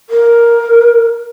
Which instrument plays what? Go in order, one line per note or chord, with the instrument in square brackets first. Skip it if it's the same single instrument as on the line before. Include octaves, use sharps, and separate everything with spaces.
[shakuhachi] A#4